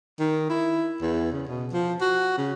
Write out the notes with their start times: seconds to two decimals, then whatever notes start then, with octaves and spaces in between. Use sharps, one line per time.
0.19 D#3
0.50 E4
1.01 E2
1.32 C#3
1.48 B2
1.72 F3
2.01 F#4
2.37 C#3